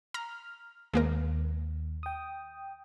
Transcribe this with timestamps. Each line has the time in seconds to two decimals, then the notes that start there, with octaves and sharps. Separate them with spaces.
0.14 A#5 F6
0.94 D#2 G#3 A#3 A#4
2.03 G5 D#6